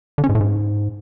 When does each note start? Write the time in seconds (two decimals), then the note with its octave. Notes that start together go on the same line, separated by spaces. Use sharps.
0.18 D3
0.24 C#4
0.29 G#2
0.35 A2
0.41 G#2